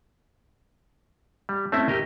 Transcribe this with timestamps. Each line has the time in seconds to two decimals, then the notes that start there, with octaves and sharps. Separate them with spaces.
1.49 G3
1.72 A3 C4 C#4 E4 E5
1.88 G4 A#4 D#5